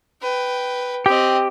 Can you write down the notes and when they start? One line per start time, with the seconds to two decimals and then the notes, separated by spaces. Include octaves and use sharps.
0.22 B4 G5
1.06 C4 G4 D#5